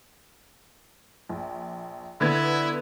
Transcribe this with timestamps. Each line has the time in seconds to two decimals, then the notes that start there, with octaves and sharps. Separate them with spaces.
1.29 A#1
2.21 D3 B3 E4 G#6